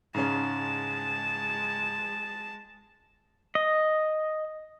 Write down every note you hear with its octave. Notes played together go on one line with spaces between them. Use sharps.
G#2 C#3 G#3 C#4 A5
D#5